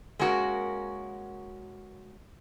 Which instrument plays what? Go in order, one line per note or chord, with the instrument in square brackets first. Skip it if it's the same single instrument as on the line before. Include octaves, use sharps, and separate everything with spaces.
[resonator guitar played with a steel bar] G#3 A#3 C#4 F#4 A#4